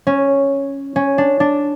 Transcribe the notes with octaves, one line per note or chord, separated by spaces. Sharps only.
C#4
C#4
D4
D4